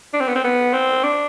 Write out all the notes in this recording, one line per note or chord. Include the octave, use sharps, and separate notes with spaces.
D4
C4
B3
C4
B3
C4
D4